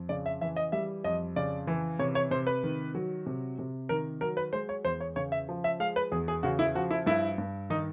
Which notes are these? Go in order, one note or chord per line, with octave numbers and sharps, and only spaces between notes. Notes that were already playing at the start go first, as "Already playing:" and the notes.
Already playing: F2
C#3 D5
E5
E3 E5
D#5
G3 E5
F2 D#5
C#3 D5
E3
C3 C#5
C#5
C3 C5
B4
D#3
F#3
C3
C3
D#3 A#4
F#3 A#4
B4
G#3 C5
C#5
E2 C5
C#5
C#3 C#5
E5
F3
E5
G#3 F5
B4
E2 G#4
G#4
C#3 F#4
E4
F3 F#4
E4
G2 E4
G2
D#3 D#4